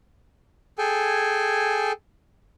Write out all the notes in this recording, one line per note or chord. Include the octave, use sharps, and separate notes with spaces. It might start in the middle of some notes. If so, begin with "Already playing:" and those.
G#4 A4 G5 G#5